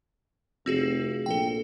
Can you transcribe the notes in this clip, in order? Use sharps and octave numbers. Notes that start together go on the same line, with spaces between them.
F1 C4 F#4 G#4
A#1 A4 G5